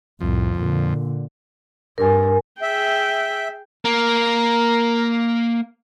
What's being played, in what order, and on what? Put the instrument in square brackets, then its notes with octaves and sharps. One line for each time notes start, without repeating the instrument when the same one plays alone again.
[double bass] C2 A2 [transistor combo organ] F2
[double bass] A#2 D3
[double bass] G2 [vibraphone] A#4 G#5
[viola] G#4 G5 [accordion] E5
[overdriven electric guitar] A#3 [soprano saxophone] A#4